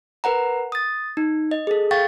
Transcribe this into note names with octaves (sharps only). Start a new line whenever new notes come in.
A#4 B4 F#5 A#5
D#6 A6
D#4
D#5
G#4 A4
F5 G5 C#6 A6